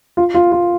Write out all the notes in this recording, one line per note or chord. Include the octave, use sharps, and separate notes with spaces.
F4
F4
F4